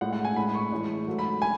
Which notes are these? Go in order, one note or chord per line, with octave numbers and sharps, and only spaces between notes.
A2 G#3 F#5
F#5
G#5
A2 G#3 B5
C#6
A2 E3 G#3
G#2 F#3 A3
B5
G#5